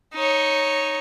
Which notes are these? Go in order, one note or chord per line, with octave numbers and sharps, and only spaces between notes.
D#4 C#5